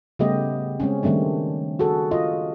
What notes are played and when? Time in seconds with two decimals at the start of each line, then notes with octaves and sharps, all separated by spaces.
0.19 C#3 G3 A3 B3 G4 D#5
0.80 G#3 C4 C#4
1.03 D#3 G3 A3 C4 D4
1.79 F#4 G#4 A4
2.11 F4 D#5